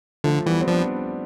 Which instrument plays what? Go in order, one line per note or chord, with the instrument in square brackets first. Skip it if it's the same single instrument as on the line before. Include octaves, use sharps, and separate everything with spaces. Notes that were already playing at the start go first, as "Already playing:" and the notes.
[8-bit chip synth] D3 [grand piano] F3 A3
[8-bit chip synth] E3 [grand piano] G3 B3
[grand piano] C4
[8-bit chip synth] F3 [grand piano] B3 D4